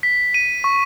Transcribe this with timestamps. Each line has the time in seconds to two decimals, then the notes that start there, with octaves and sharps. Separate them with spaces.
0.03 B6
0.34 D#7
0.64 C#6